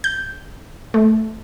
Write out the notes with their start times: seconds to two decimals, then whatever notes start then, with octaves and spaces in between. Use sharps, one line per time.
0.04 G6
0.94 A3